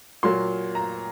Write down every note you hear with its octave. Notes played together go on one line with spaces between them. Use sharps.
A#2 F#3 A#3 C6
A#5